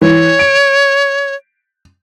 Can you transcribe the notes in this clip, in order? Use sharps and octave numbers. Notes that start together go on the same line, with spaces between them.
E3 C#5
D7